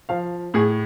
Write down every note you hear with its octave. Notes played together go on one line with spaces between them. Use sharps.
F3 F5
A2 G#4